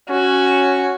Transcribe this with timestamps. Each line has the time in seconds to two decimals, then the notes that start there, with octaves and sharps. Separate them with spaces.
0.10 C#4 F#4